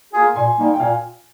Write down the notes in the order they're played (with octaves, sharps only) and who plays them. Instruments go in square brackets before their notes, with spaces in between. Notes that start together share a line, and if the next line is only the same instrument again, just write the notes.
[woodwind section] A#3 F4 G#4
[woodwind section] A#2 [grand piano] G#5 C6
[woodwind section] G3 A#3 D#4
[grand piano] G5
[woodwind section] A#2 [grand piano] F5 G#5